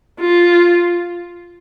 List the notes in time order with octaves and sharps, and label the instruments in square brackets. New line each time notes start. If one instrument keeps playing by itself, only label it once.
[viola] F4